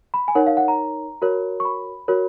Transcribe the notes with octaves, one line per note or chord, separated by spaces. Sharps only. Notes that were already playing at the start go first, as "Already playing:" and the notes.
B5
G#5
D#4 A#4 C#5 F#5
F5
F#5
A#5
F#4 A#4 C#5
C#6
B5
F#4 A#4 C#5